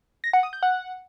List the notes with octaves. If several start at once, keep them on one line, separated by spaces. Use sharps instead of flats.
A#6
F#5
D#6
G6
F#5